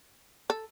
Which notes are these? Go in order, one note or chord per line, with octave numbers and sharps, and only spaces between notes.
A4